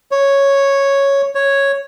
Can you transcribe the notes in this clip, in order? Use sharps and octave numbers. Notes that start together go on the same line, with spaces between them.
C#5
C#5